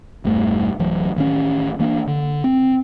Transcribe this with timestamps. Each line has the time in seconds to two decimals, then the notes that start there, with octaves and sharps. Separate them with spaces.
0.24 E1 G2 A3
0.79 D1 E3 F#3
1.16 A1 D#3 F#3 C#4
1.79 E3 A#3 D4
2.07 D3
2.44 C4